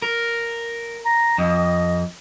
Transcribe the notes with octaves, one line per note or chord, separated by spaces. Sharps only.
A#4
A#5
F2 D#5